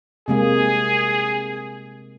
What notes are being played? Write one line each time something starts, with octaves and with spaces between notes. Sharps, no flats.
C3 G#3 A#3 G#4